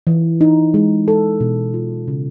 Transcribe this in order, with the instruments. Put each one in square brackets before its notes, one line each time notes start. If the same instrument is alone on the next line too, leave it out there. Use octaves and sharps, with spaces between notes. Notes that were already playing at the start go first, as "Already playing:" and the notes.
[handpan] E3
D#4
G#3
A4
B2
F4
C#3